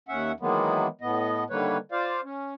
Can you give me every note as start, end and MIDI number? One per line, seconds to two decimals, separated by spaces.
0.09 0.32 39
0.09 0.32 61
0.09 0.32 76
0.09 0.32 78
0.40 0.87 51
0.40 0.87 52
0.40 0.87 54
0.40 0.87 56
0.40 0.87 58
0.40 0.87 59
1.01 1.44 45
1.01 1.44 59
1.01 1.44 75
1.50 1.77 50
1.50 1.77 51
1.50 1.77 55
1.50 1.77 58
1.50 1.77 71
1.50 1.77 73
1.92 2.21 65
1.92 2.21 72
1.92 2.21 74
1.92 2.21 77
2.24 2.54 61